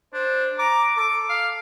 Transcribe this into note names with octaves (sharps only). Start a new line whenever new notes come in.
D4 C5
A#5 D6
A4 D6
F5